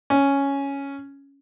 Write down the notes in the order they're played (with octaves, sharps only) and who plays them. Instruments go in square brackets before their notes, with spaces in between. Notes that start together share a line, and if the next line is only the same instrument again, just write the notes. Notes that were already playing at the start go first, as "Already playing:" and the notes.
[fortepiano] C#4